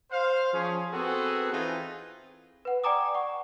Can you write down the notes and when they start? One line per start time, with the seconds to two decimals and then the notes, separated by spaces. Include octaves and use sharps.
0.11 C5 F5
0.53 F3 C#4 G#4
0.92 B3 C4 F#4 G#4 A4 B4
1.51 E3 C4 D#4 F4 G#4 B4
2.65 B4 F#5
2.84 D5 G5 G#5 A#5 D6 D#6
3.15 F#5 C#6